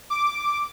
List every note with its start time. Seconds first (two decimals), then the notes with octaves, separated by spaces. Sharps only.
0.10 D6